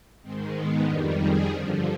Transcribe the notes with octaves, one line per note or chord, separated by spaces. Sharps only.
G#2 D#3 G#3 C4
B3
F2 D#3 G3 D4
G#4
G2 D3 F3